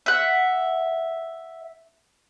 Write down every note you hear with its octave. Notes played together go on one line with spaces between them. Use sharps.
E5 F#5